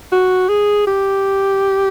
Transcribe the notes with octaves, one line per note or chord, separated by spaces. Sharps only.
F#4
G#4
G4